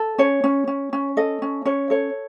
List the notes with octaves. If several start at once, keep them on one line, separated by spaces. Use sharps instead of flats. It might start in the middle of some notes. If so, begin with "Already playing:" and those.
Already playing: A4
C#4 C#5
C#4
C#4
C#4
A4 D#5
C#4
C#4 C#5
A4 C#5